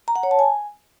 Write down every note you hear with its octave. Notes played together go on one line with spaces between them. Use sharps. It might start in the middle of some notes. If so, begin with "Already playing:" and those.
A#5
F#5
C#5
A5
G#5